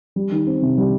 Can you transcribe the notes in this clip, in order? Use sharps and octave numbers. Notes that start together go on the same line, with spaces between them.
G3
D#3
C4
C3
G3